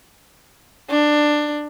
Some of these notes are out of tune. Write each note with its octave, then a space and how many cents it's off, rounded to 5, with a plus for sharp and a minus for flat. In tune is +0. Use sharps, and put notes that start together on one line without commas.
D4 +15